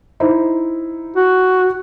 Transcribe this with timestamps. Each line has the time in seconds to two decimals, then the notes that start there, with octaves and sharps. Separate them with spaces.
0.20 D#4 E4 C5
1.16 F#4